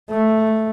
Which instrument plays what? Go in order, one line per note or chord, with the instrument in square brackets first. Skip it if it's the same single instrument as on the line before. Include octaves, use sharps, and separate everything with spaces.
[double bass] A3